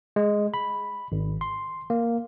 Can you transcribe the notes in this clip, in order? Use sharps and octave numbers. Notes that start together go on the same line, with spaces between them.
G#3
B5
G#1
C6
A#3